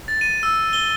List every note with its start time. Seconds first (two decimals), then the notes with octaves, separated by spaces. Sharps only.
0.08 A6
0.21 D#7
0.43 E6
0.73 G7